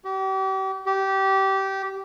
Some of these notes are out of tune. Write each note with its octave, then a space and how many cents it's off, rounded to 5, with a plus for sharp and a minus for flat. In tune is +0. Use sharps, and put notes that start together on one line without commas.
G4 -40
G4 -20